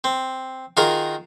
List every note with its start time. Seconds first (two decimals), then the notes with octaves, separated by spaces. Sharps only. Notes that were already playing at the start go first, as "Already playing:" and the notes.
0.04 C4
0.77 D#3 F4 F#4 G#4 A#4 A#5